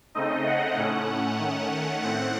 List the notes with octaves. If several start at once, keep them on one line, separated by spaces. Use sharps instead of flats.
C#3 A3 C4 D#4 D#5
F#5
A2 A3 C#4 F#5
D#3 A3 C#4
A2 A3 C4 F#5